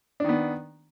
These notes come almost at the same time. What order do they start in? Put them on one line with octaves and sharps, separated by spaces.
D4 D#3 B3